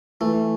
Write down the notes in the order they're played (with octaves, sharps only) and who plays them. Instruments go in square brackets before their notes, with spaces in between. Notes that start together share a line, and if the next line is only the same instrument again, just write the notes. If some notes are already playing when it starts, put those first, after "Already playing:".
[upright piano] E3 [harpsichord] A3